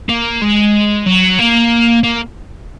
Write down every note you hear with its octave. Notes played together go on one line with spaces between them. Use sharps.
A#3
G#3
F#3
A#3
A#3